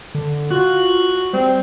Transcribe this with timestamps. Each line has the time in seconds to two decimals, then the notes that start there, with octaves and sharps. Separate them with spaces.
0.15 D3
0.51 F4 F#4
1.33 G3 C4